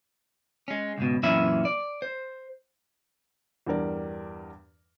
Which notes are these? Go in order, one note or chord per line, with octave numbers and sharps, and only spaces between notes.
G#3 C#4
C#2 G#2 B2
F#2 A#2 E3 C#4 E5 B5
D5
C5
E2 G2 G3 A#4 D5